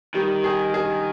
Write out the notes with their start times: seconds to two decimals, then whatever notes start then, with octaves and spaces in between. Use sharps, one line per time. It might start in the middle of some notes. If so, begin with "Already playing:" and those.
0.14 D#3 G3
0.44 G#4
0.74 G#4